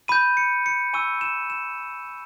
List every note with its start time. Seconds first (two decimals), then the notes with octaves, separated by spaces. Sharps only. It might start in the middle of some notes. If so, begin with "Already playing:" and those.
0.08 B5 G6 D#7
0.37 C#7
0.66 C#7
0.93 G#5 C#6 E6 D#7
1.21 E7
1.50 E7